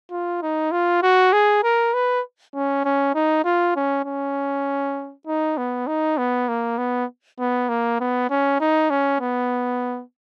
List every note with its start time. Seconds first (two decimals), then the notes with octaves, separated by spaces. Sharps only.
0.11 F4
0.42 D#4
0.72 F4
1.03 F#4
1.33 G#4
1.63 A#4
1.94 B4
2.54 C#4
2.85 C#4
3.15 D#4
3.44 F4
3.76 C#4
4.05 C#4
5.27 D#4
5.58 B3
5.87 D#4
6.18 B3
6.48 A#3
6.78 B3
7.39 B3
7.69 A#3
8.00 B3
8.30 C#4
8.60 D#4
8.90 C#4
9.21 B3